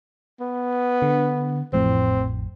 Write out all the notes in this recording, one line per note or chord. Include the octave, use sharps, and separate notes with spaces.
B3
D3
A1 F2 A2 C4